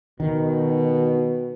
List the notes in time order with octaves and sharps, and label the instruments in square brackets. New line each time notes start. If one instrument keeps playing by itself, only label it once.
[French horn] B2 [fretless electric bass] D#3